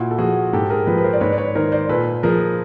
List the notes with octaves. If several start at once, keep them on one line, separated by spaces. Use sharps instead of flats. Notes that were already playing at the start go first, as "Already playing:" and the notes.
Already playing: A#2 E4 F#4
A4
F3 F#4 G#4
G#2 G4 A4
G#4 A#4
F3 A4 B4
B4
A#4 C5
D5
G#2 B4 C#5
D5
B4 C#5
D#3 A#4 C5
C5 D5
A#2 A4 B4
F3 G#4 A#4